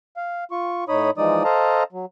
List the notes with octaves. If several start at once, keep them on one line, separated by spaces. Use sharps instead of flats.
F5
F4 C#6
A2 D#4 C#5 B5 D#6
E3 F3 G#3 D#4 D5 D#6
A4 C5 D#5 F5 A5 A#5
F#3